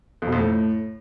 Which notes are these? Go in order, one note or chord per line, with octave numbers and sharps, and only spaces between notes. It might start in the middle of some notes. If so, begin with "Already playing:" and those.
F2
B2
F2
A2